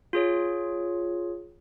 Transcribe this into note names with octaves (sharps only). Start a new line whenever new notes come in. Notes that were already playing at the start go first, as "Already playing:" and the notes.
F4 G#4 C#5